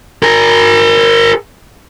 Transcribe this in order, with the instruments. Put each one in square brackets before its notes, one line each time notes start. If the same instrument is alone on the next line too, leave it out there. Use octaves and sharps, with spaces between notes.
[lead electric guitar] G#4 A#4